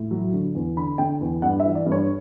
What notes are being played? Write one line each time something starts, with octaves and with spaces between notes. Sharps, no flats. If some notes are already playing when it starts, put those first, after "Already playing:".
Already playing: A2
F#3
D3
E2
D3 B5
D3 G5
E2
G2 F#5
E5
E3
D5
G2
C#5